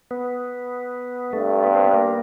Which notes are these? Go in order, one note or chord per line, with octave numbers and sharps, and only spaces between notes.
B3
G2 A3
B3
C4
B3
A#3